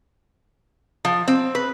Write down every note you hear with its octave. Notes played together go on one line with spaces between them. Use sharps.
F3
C4
B4